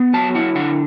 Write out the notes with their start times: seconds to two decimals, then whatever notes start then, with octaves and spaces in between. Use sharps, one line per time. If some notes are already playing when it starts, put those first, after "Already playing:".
Already playing: B3
0.14 F#3 A5
0.35 E4 F#5
0.55 D3 F#5